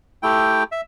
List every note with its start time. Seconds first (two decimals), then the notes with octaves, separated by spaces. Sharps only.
0.23 A3 E4 G4 G5
0.72 E5